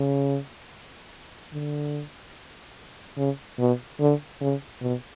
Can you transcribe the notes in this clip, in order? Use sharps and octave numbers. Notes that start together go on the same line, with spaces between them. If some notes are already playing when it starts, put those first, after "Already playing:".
Already playing: C#3
D3
C#3
B2
D3
C#3
B2